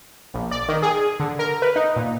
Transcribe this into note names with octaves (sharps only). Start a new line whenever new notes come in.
A#1
D5
D#3
G#4
D3
A#4
B4
D#4
A#2